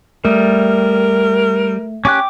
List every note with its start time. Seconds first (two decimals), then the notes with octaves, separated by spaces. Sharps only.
0.25 G3 A3 A#4
2.05 C#4 G4 G5 D6 F#6